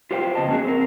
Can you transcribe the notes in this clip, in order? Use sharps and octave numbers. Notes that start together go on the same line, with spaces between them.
F4 G4 B4 C5 F5 G5
F2 C#3 B3 D#5 A5
A#3 C#4 D4 F#4 G#4
C4 A#4